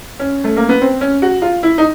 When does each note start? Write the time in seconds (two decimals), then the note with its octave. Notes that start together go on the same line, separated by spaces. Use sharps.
0.20 C#4
0.44 A3
0.57 A#3
0.69 B3
0.82 C4
1.01 C#4
1.22 F#4
1.42 F4
1.63 E4
1.78 D#4